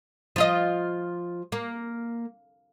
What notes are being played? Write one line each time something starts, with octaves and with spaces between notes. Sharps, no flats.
F3 F4 D#5
A#3